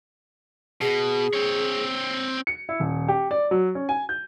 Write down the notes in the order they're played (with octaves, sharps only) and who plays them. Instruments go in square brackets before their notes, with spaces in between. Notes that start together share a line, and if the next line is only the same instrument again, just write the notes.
[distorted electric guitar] B2 [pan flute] G#4
[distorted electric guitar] C4 C#5
[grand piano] C#7
E4
D#1
G4
D5
F#3
C#4
G#5
G6